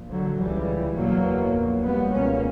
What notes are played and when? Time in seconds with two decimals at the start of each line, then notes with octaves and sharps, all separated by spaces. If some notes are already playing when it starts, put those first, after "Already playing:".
Already playing: A#1 A#2
0.10 D3 F#3
0.38 C#2 C#3 E3 G3
0.96 F#1 E2 B2 F#3 A#3
1.53 A#1 A#2
1.83 G3 B3
2.11 C#2 B2 A#3 C#4